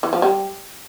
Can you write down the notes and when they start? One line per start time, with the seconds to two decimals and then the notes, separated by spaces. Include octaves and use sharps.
0.03 E3
0.13 F3
0.22 G3